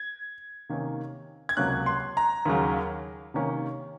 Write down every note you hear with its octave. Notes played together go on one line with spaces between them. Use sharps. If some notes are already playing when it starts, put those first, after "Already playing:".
Already playing: G#6
C3 D#3 A#3 C#4
G#6
C#2 C3 F#3 A#3 C#4 F#6
C6
A#5
D#2 C#3 F#3
C3 D#3 A#3 C#4